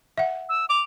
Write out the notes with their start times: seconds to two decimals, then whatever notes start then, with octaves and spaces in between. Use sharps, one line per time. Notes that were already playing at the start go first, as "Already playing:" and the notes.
0.18 E5 F#5
0.49 E6
0.70 D6 F7